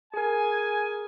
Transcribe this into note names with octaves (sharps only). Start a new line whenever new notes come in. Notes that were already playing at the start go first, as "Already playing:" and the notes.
G#4 A#4 G#5